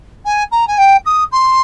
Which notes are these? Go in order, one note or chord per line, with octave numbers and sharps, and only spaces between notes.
G#5
A#5
G#5
G5
D#6
C6